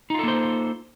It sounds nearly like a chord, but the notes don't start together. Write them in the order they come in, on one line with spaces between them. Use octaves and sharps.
D#4 F4 A4 A#3 C5